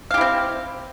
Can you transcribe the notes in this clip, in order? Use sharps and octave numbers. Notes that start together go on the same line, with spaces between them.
C4 E4 G4 F5